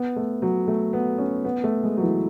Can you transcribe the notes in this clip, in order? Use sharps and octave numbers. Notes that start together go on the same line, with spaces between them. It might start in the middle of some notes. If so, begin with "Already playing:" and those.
Already playing: B3
A3
F#3
A3
B3
C#4
B3
A3
G#3
F#3
E3